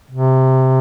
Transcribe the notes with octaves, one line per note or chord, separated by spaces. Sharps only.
C3